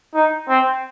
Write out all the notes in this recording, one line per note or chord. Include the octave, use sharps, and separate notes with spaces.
D#4
C4